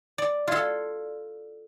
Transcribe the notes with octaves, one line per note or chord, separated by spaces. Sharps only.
D5
F4 F#4 A4 D5 F5